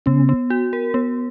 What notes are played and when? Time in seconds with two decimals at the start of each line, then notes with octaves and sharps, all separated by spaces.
0.06 C#3 B3 C#4
0.29 B3
0.50 F#4
0.73 A#4
0.94 B3